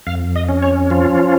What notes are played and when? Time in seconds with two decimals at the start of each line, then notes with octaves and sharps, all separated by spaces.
0.07 F2 F5
0.36 D#5
0.49 C#4
0.63 C#5
0.90 F3 F4